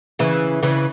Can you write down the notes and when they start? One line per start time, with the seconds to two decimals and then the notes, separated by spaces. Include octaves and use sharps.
0.19 C#3 E3
0.63 C#3 E3